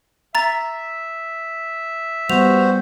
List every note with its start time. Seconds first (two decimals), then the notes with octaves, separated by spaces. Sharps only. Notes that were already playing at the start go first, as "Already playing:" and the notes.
0.35 E5 A#5 A6
2.30 G3 B3 F#4 C5 F7